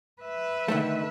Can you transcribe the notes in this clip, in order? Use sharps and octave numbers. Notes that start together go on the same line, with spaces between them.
B4 E5
D3 D#3 A3